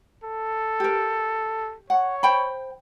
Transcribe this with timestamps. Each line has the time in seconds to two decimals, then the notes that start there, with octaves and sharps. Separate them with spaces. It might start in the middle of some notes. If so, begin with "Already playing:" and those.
0.24 A4
0.80 G4 A#4
1.90 C#5 F#5
2.23 C5 G5 B5